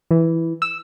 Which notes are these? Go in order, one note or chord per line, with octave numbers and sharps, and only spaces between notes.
E3
E6